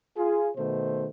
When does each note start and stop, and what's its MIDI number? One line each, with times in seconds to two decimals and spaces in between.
0.17 0.48 65
0.17 0.48 68
0.57 1.08 47
0.57 1.08 51
0.57 1.08 57
0.57 1.08 72